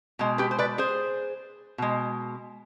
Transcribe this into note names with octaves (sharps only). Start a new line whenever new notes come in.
B2 G#3
G4 B4
C5
B4 D5
G#4 C5
B2 G#3